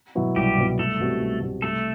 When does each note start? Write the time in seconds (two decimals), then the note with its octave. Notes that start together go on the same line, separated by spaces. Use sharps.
0.15 B2 F#3 B3 E4
0.36 C2 G3 G4
0.58 B2 F#3 B3 E4
0.78 C2 A3 A4
1.00 B2 G3 C4 F#4
1.21 C2
1.42 B2 G3 C4 F#4
1.62 C2 A3 A4